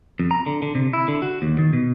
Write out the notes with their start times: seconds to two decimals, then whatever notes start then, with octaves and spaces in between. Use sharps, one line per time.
0.20 F2
0.31 A#5
0.46 D3
0.62 D3
0.75 C3
0.93 E4
1.08 D3
1.22 F#4
1.42 D#2
1.59 D#3
1.73 B2